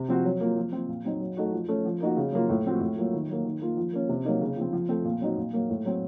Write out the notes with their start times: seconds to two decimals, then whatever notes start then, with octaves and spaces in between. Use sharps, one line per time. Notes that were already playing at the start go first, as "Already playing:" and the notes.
Already playing: C3
0.09 F3 C4 F#4
0.25 F#3
0.40 A#3 F4
0.57 F3
0.72 C4 F4
0.88 A#2
1.05 F#3 C4 D#4
1.21 F#3
1.37 A3 D#4 F#4
1.52 F3
1.68 A3 C#4
1.85 F3
2.01 A#3 D#4 F#4
2.17 C#3
2.33 F#3 A#3 F4
2.49 A2
2.65 F3 C4 F#4
2.81 A2
2.97 F#3 A#3 F4
3.13 D#3
3.29 F#3 A#3
3.45 D#3
3.61 A#3 F4
3.77 F3
3.93 A#3 C#4
4.09 C3
4.25 F#3 A#3 D#4
4.41 C#3
4.57 F3 C4
4.73 F3
4.89 A3 C4
5.05 A#2
5.21 F#3 C4 D#4 F#4
5.37 A#2
5.53 F#3 A#3
5.70 A2
5.85 F#3 C4